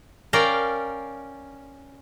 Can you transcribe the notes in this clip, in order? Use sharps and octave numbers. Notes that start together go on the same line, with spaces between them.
C#4 A#4 D5 F5 G5 A#5